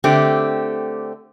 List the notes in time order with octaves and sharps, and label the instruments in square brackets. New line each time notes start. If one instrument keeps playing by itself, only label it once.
[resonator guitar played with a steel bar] D3 A3 C4 G4